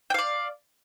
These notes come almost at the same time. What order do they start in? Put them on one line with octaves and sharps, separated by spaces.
G5 F5 D5